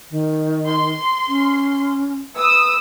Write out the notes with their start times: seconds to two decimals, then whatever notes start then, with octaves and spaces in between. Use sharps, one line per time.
0.11 D#3
0.69 C6
1.28 C#4
2.37 B4 D#6 E6